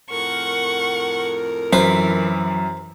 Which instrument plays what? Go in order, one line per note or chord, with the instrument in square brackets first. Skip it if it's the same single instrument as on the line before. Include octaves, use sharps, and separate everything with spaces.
[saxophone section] F2 A2 A#4 [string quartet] F#5 C#6
[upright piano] F#2 [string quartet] E3 [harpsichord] B4 C5